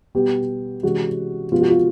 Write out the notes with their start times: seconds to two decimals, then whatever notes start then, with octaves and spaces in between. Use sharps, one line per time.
0.15 B2 G3 B3 G4
0.83 C3 E3 G#3 C#4 F#4
1.52 C3 F3 G#3 B3 F4
1.61 F#4
1.70 F4